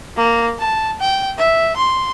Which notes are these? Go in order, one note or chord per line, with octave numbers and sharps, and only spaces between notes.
A#3
A5
G5
E5
C6